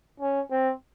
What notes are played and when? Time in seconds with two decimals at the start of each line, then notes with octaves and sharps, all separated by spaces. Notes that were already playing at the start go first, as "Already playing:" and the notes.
0.20 C#4
0.51 C4